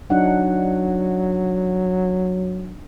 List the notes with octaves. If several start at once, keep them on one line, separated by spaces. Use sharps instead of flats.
F#3 D4 D#4 F#5